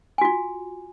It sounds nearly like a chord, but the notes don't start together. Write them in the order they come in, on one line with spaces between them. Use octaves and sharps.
G#5 F#4 F4